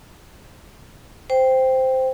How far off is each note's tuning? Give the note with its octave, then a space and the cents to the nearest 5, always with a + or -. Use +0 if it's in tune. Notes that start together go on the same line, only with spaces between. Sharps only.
C5 -5 G5 +0